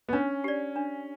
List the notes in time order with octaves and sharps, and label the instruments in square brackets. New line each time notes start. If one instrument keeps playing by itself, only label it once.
[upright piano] B3
[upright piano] C#4 [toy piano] D4
[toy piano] G4 D5
D4